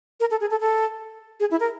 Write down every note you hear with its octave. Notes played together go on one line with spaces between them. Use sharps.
A#4
A4
G#4
A4
A4
G#4
E4
A#4